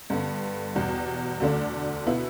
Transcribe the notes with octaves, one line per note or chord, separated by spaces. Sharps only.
G2 D3 B3
E2 B2 G3
D2 D3 A3 D4
B2 B3 E4